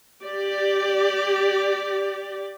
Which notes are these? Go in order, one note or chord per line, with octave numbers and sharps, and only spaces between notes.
G4 D5